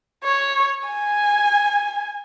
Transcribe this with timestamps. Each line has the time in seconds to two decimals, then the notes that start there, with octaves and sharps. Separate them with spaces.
0.24 C#5
0.89 G#5